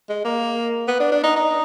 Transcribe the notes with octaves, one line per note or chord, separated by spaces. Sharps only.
G#3
A#3
B3
D4
D4
D#4
D#4